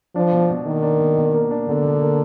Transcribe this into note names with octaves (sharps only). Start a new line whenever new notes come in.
F3 D4
B2
B2
D#3 A#3
D4
B2
B2
A#3
D4
B2 D3
B2
A#3